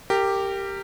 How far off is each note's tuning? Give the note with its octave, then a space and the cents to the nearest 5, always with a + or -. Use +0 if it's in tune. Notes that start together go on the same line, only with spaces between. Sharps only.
G4 +0 A#4 -25